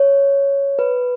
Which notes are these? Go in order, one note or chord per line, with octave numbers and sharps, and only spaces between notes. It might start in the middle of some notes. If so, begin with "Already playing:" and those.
Already playing: C#5
B4